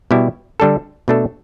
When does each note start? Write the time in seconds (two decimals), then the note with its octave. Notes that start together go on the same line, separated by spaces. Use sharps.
0.11 B2 G3 E4 G4
0.60 D3 G3 D4 A4
1.08 B2 A3 D4 A4